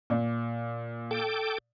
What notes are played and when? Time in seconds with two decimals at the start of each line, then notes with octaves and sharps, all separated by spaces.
0.10 A#2
1.11 A4 G5 D6